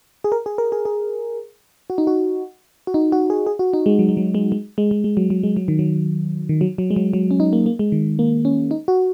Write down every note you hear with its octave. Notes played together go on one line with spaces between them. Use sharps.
G#4
A#4
G#4
A#4
G#4
G#4
F#4
D#4
F#4
F#4
D#4
F#4
G#4
G#4
F#4
D#4
G#3
F#3
G#3
F#3
G#3
G#3
G#3
G#3
G#3
F#3
F#3
G#3
F#3
D#3
F#3
D#3
F#3
F#3
G#3
F#3
F#3
C#4
D#4
A#3
A#3
G#3
D#3
A#3
C#4
D#4
F#4